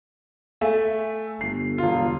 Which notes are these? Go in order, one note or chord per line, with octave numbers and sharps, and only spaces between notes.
A3 E5 G#5
G1 C7
E1 F4